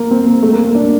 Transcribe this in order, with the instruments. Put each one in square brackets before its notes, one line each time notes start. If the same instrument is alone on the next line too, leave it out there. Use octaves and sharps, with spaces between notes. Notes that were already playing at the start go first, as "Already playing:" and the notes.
Already playing: [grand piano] A#3
C4
A#3
A3
A#3
A#3
D4